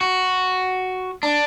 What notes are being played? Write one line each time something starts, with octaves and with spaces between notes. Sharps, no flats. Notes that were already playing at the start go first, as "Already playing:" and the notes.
F#4
D4